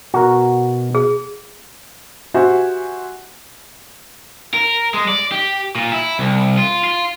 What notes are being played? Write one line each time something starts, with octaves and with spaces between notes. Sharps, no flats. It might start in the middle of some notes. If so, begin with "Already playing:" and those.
B2 F#4 A#4
G#4
F#4 G4 C5 E5 G#5
A#4
G#3
D5
G4
A#2
E4
C2
F4
F4